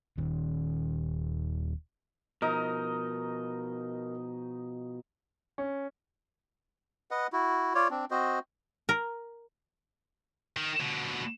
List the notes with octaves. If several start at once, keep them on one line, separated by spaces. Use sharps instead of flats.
D#1 D#2
B2 F3 D#4 A#4 D#5
C#4
B4 D#5 F#5
E4 F#4
F4 C#5 D5
C4 D4
C4 F#4 C5 D#5
A#4
D#3
B2 D3